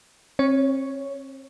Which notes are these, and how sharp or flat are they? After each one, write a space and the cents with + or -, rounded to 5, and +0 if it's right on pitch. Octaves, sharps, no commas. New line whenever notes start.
C4 +40 C#5 +0